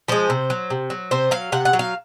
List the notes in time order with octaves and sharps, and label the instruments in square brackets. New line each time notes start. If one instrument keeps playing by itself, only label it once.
[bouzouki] F3 G#3 C5
C3
F#3
C3
F#3
C3 C5
F#3 F5
C3 F#5
F#5
F#3
F5